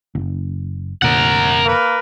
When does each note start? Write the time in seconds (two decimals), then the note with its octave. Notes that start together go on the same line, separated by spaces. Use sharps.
0.15 F#1
1.02 F1 A#2 D3 A#4 F#5
1.65 A#3 A#4 B4